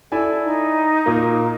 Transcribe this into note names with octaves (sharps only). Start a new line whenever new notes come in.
E4 A4 D5 G#5
D#4
A#2 A#3